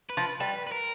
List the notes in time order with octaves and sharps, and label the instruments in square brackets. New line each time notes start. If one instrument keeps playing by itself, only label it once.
[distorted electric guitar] B4
[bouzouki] F3
[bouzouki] G3 [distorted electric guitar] B4
[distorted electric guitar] B4
A#4